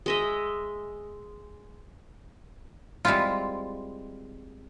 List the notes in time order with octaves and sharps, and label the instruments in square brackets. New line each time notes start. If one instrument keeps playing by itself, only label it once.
[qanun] G#3 D#5 E5
[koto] G3 G#3 C4 E4 F4